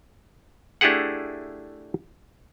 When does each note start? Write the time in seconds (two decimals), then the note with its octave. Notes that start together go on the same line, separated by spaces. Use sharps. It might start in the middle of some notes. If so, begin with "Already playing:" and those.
0.81 A3 D4 E4 G4 G#4 F#5